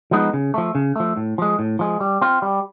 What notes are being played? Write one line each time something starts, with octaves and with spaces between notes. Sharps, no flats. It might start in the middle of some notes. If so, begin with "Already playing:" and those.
F3 G#3 B3 D#4
C#3
F3 A3
C#3
F3 A3
A2
F3 G#3
A2
F3 G#3
G3
C4 F4
G3